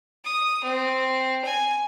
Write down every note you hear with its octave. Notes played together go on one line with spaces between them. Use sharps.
D#6
C4
G#5